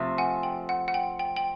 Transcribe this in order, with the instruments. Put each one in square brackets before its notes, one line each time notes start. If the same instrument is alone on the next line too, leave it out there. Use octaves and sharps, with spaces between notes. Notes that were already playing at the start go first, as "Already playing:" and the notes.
Already playing: [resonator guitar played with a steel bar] C3 F3 A3
[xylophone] F#5 G#5
G5
F#5
F#5
G5
G5
G5